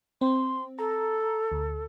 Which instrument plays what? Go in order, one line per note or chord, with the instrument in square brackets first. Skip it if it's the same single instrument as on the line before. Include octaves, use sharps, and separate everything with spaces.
[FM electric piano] C4 [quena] C6
[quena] A4 [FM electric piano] A#5
[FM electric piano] D2